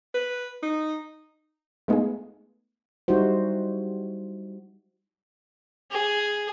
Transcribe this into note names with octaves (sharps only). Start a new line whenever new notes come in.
B4
D#4
G#3 A3 B3 D#4 F4 G#4
G3 D#4 E4 F#4 C5
G#4